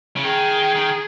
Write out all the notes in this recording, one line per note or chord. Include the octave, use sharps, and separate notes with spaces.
C#3
D#3 G#4
D#3